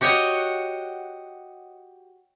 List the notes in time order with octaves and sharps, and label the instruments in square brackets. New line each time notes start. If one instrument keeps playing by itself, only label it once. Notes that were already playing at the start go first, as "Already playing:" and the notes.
[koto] F#4 G4 C#5 D#5 F#5